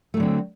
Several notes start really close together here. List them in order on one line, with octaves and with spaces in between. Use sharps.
A3 F#3 D3 C4